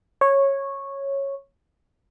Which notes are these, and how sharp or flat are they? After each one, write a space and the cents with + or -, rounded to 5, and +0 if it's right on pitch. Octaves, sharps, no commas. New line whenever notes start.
C#5 -10